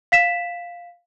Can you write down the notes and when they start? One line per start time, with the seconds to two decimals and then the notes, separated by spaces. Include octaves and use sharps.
0.12 F5 B6 E7